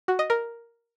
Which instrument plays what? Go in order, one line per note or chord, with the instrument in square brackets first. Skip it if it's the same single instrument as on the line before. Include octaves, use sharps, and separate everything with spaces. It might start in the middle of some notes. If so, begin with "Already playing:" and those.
[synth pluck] F#4
D#5
A#4